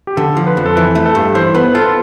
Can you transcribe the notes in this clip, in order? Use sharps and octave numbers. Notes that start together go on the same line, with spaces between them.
G4
D3 A4
F3
B4
F2
A4
E3 B4
A3
A4
G2
E3 C5
B3 B4
F4 A4